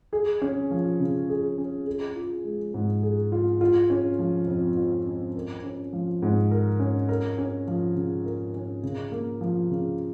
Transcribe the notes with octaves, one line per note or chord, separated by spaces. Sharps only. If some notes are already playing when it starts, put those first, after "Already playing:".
G#4
C#4
F3
C#3
G#4
C#4
G#4
F4
G#3
G#2
G#4
F4
F4
C#4
F3
F2
F4
C#4
A#4
C#4
F3
G#2
A#4
C#4
A#4
C#4
F3
C#3
A#4
C#4
C#3
A#3
F3
C#3